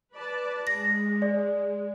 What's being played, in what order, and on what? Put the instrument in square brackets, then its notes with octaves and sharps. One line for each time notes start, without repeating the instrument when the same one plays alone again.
[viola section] B4 D5 A5
[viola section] G#3 [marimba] A#6
[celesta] D5